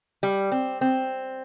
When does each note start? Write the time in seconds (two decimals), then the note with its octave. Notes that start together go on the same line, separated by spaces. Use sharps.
0.23 G3
0.52 C4
0.81 C4